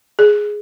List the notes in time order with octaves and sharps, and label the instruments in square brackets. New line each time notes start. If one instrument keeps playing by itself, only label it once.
[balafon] G#4